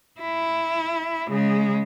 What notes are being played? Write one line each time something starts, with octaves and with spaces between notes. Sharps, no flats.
E4
C#3 G#3